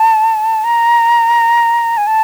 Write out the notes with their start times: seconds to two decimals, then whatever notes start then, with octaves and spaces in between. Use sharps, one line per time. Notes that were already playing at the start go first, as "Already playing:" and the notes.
Already playing: A5
0.64 A#5
1.97 G#5
2.07 A5